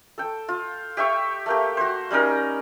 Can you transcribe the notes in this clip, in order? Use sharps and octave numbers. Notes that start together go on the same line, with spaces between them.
A4 G5
F4
G4 E5 G5 C#6
A3 A#3 G4
F#4 C5
G3 C#4 D#4 A#4